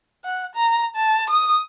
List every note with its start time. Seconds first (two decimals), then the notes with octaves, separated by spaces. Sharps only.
0.24 F#5
0.55 A#5
0.96 A5
1.30 D#6